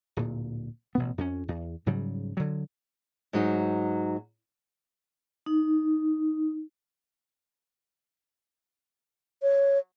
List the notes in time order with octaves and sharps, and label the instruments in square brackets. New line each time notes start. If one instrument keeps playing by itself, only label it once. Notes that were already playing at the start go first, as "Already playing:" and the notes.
[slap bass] D1 A#2
A1 B2 B3
F2 C#4
E2
G#2 C#3 F#3 G3
D3 F#3
[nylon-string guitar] G#2 F#3 D#4
[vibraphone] D#4
[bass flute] C#5